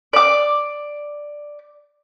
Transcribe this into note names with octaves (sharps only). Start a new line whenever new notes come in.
D5 D6